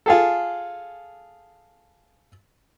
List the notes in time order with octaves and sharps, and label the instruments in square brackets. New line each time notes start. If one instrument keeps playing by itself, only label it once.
[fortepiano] F4 G#4 A4